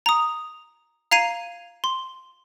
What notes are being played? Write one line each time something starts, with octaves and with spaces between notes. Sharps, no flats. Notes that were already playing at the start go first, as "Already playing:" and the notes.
A#5 D#6
F5 A#5 G#6 C7 D#7
C6